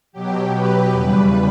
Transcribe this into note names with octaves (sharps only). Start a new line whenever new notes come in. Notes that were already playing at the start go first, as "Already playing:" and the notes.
B2 F#3 G4
B4
E2 C#3 G3